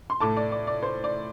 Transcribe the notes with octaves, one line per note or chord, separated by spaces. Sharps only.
C6
A2 A3 A5 D6
D5
D5
D5
C5
D5